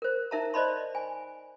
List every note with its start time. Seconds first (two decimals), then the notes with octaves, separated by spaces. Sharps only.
0.02 A#4 C5
0.31 D#4 A#4 E5 A5 A#5
0.54 C5 D5 D#5 A5 B5 C6
0.95 G#5